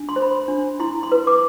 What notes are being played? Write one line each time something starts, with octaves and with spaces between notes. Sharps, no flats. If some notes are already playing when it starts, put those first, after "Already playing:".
Already playing: D4
C6
C5
B5
C6
D4
E4 C6
C6
B4
D6